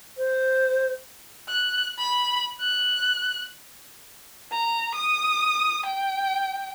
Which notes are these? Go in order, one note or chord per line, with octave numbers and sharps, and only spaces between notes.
C5
F#6
B5
F#6
A#5
D#6
G5